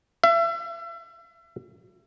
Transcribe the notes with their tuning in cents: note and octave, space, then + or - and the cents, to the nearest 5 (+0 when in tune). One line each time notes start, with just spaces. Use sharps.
E5 +35